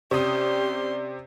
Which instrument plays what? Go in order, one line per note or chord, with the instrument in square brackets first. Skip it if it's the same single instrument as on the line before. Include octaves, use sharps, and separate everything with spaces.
[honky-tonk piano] C3 D#6 [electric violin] C#4 C6 [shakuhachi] G4 [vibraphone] D5